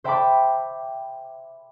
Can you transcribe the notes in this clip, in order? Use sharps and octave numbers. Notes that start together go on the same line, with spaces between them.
C5 E5 G5 A5 B5 D6